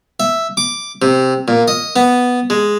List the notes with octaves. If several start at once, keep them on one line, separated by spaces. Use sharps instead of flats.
E5
D6
C3
A#2
D#5
B3
G#3